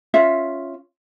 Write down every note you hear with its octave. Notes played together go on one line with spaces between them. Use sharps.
C#4 F4 E5